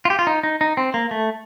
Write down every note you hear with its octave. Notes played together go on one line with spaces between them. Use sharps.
F4
G4
F4
D#4
D#4
D#4
C4
A#3
A3